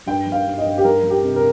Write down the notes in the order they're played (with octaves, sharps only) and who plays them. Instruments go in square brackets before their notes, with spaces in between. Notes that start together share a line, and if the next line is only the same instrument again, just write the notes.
[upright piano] G2 G5
G3
F5
G2
D#5
G2
G4
G3 A#4
G3
G4
C3
A#4